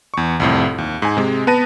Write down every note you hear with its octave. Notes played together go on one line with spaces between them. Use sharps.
E2 C#6
C2 F2 A2
D#2
G#2 G#5
C3 G#3
B3 B4 A5 A#6 D#7